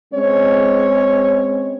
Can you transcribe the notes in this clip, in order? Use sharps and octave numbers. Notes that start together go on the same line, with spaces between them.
G#3 C4 C#4 C#5